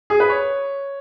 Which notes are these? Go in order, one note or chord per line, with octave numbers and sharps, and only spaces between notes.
G#4
B4
C#5